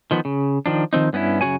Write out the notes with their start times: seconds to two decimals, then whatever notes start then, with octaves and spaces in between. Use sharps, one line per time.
0.11 D#3 F3 B3
0.25 C#3
0.66 D#3 F3 D4
0.93 D#3 F3 C4 D#4
1.13 G2 B3 C#4 D#4 E4
1.41 F#2 C#3 D4 F#4 C#5 G#5